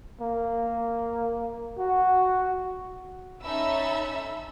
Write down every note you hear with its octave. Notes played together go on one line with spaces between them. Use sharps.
A#3
F#4
C#4 D#4 A4 E5 B5 E6